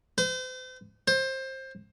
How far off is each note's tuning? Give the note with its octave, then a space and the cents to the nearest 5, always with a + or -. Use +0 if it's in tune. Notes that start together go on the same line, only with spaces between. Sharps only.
C5 -40
C5 +20